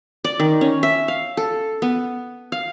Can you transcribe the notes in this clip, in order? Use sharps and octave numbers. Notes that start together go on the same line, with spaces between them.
D5
D#3
C#4
E5
F5
A4
B3
F5